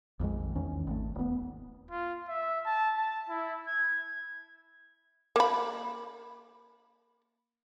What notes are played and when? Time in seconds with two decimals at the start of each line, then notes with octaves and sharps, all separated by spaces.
0.19 A#1 F2 D#3 G#3
0.56 E2 D#3 C#4
0.87 G#1 A3
1.15 D#1 B3
1.91 F4
2.29 E5
2.66 A5
2.97 A5
3.29 E4
3.68 G#6
5.36 A#3 B5